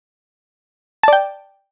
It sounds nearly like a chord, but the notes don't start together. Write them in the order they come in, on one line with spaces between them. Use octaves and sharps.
A5 D5 G5